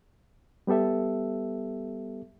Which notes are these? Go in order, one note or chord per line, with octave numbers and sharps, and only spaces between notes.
G3 B3 G4 A4 E5